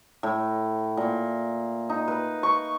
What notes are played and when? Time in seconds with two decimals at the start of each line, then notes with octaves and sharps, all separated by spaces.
0.23 A2
0.97 A#2
1.89 D#4
2.08 B4
2.43 C#6